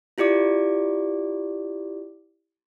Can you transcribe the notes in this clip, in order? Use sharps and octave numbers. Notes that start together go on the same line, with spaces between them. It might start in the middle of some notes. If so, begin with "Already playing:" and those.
E4 F4 G4 D5 D6